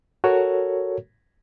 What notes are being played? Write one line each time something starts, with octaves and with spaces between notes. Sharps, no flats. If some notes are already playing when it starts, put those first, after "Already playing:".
F#4 A4 A#4 C#5